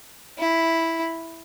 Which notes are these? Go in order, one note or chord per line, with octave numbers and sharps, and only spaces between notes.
E4